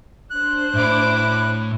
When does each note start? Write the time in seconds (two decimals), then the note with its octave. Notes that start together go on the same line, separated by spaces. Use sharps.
0.30 D4 C5 F#6
0.74 A2 E4 D6